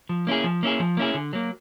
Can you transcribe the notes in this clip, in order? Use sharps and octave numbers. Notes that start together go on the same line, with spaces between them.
F3
A#3 C#4 E4 G#4
F3
A#3 C#4 E4 G#4
F3
A#3 C#4 E4 G#4
D3
F#3 A#3